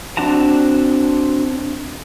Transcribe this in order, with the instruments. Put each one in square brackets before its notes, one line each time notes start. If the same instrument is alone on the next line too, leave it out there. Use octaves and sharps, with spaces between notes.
[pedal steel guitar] C4 D4 F#4 A5 A#5